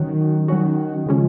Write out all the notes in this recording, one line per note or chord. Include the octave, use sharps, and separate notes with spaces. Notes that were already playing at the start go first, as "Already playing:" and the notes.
Already playing: D#3 F#3 C#4 F#4
D#3 F#3 C#4 F#4
D#3
C#3 F3 G#3 C#4